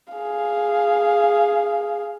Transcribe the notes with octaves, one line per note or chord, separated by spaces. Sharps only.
G#4 F5